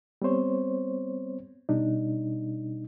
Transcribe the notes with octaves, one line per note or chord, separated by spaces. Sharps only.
G3 B3 C4 C5 C#5
B2 G3 D4 D#4